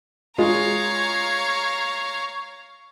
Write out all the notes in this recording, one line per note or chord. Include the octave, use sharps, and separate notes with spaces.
G#3 F4 C#5 F5 A#5